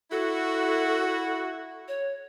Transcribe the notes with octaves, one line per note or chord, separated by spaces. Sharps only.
E4 F#4 A4
C#5